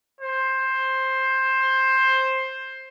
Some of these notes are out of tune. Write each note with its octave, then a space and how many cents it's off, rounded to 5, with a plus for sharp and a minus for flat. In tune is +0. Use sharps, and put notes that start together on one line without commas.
C5 +10